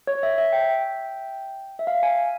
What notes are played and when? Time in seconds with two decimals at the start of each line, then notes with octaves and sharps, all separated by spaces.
0.07 C#5
0.23 E5
0.38 E5
0.53 G5
1.79 E5
1.87 F5
2.03 G#5